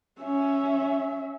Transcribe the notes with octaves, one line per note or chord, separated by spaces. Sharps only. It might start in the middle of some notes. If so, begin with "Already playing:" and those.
C#4 E5